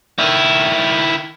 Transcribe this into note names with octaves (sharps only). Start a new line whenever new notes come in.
D#3 E4